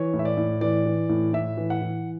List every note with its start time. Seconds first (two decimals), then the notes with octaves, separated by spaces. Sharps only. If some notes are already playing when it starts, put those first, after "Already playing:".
Already playing: E3 C#5
0.13 A2
0.19 E5
0.25 D5
0.37 A2
0.61 E3 D5
0.86 E3
1.09 A2
1.33 A2 E5
1.57 E3
1.70 F#5
1.82 E3